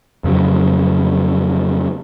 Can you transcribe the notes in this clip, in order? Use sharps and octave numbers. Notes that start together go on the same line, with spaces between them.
F2 C#3 F#3